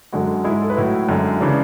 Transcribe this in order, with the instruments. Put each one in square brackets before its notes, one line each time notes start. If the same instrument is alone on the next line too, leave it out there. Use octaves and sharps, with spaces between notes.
[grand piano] F#2 D3 G#3 F#4
G#3 E4
G#2
A4
B4
A2 F#3 E4
F#2 D3 G#3
C#3 E3 G#3 D4